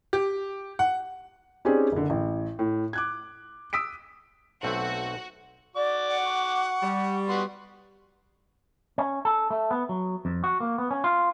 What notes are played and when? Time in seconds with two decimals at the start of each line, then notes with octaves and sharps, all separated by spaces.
0.13 G4
0.79 F#5
1.65 C4 C#4 D#4 G4 G#4 D5
1.92 F#1 D3
2.10 A1
2.59 A2
2.93 D6 F#6 G#6
3.73 D#6 E6 B6 D7
4.63 B1 A3 C4 F#4
5.76 F#4 D5 D6
6.09 F#5
6.24 C#6
6.82 G3
7.28 B3 F#4 C6
8.98 C#4
9.25 A4
9.50 A3
9.71 B3
9.89 F#3
10.25 F2
10.44 F#4
10.60 A#3
10.78 B3
10.91 C#4
11.04 F4